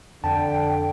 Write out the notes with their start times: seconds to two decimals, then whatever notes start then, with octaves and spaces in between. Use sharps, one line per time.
0.24 F2 D3 G5 A5